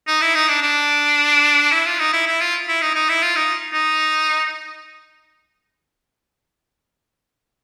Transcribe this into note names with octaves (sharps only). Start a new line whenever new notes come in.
D#4
E4
D#4
D4
D4
E4
F4
D#4
E4
E4
F4
E4
D#4
D#4
E4
F4
D#4
D#4